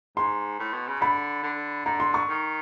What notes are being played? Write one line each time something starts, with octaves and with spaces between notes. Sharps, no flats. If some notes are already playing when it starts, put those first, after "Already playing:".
G#2 C6
A2
B2
C#3
D3 B5
D3
D3 A#5
C6
C#6
D#3